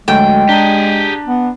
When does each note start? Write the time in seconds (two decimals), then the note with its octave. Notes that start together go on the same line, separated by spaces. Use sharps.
0.08 D2 F#3 G#3 A3 G5
0.49 D4 G4 G#4 A5 A#5
1.27 B3